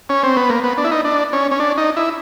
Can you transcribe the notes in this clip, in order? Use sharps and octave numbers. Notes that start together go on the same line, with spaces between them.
C#4
C4
B3
A#3
B3
D4
E4
D#4
D4
C#4
C#4
D4
D#4
E4